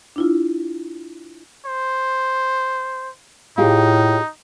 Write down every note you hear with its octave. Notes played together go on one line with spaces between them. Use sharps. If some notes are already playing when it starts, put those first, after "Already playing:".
D4 E4 F4
C5
A2 D#4 F4 G4 G#4